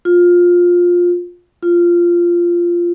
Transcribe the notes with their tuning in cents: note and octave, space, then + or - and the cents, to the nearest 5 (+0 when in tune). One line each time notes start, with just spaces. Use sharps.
F4 +15
F4 -10